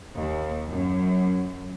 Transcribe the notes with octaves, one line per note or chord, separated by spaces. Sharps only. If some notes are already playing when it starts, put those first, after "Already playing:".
D#2
F#2